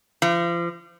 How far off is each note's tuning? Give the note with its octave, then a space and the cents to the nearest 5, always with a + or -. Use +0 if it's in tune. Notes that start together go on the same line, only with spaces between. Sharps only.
F3 -35